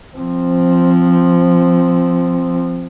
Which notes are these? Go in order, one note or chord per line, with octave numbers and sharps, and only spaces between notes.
F3 C4